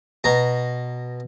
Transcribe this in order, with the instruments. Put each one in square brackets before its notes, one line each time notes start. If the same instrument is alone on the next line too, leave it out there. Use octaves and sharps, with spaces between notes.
[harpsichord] B2 A#5